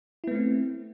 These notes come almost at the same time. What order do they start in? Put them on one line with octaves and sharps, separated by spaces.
E4 B3 A3 C4